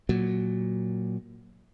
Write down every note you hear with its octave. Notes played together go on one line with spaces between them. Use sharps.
A#2 F#3